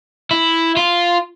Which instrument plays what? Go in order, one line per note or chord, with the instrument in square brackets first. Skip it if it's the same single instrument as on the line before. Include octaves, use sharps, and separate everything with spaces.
[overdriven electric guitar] E4
F4